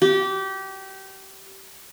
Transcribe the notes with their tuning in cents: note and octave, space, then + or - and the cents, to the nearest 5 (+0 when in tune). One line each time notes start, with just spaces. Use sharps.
G4 -25